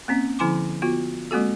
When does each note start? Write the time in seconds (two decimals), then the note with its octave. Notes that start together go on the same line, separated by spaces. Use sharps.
0.08 A#3 C4 C#4
0.39 D3 F3 E4 G#5 C6 D6
0.82 B3 F4 F#4
1.31 G#3 A#3 C4 F#4 A4